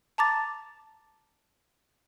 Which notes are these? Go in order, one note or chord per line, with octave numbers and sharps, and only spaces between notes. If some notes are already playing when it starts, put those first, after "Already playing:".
A5 A#5 D6 A6